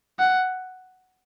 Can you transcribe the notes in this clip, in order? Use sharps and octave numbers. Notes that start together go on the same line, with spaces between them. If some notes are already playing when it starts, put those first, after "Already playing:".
F#5